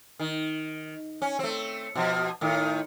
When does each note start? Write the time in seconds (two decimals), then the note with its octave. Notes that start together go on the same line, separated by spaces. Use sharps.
0.19 D#3
1.22 C#4
1.39 A3 C4
1.95 B2 F3
2.41 A2 D#3